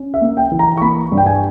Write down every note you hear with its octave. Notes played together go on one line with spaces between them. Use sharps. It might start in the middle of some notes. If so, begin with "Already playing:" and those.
Already playing: C#4
E5
A#3
G5
E3
A#5
C#6
A#3 B5
G2
G5
G#5